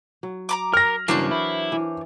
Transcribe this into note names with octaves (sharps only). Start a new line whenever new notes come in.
F#3
A#5 B5 D6
A#4 F6 A#6
G2 C#3 E3 F#3 D4 A#4 C5 C#5
E4
E3